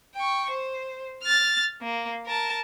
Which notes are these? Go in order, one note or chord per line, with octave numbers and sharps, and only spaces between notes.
G5 C#6
C5
F6 A6
A#3
A#4 A5